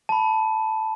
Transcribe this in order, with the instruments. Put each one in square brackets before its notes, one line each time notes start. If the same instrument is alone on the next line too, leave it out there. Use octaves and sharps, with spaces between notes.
[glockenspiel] A5 B5